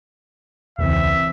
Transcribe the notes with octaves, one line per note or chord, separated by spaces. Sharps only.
E1 C#2 C#3 E3 C4 E5